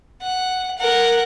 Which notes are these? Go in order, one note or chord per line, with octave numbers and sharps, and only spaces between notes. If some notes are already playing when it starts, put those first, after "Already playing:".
F#5
A#4 F#5